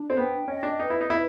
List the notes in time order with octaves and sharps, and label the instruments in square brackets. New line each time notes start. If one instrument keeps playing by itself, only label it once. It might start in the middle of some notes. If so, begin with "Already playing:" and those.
Already playing: [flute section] D4
[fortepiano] C4
[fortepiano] B3 [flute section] G5
[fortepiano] C#4 [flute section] D#5
[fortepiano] D4
[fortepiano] D#4 [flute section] B4
[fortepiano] E4
D#4
[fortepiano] E4 [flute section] B4